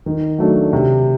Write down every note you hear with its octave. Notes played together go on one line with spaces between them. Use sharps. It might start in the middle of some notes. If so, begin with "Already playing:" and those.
D#3
F#3 A3 D4
C3